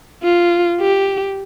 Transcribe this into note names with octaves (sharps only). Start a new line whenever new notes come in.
F4
G4